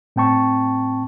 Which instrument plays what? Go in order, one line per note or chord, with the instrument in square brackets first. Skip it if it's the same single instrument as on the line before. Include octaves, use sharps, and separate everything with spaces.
[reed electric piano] A2 C4 G5 A5 C#6